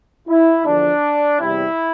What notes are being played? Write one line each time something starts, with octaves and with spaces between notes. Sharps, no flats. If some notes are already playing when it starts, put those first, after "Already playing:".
E4
E2 D3 F3 D4
E2 C3 G3 C4 E4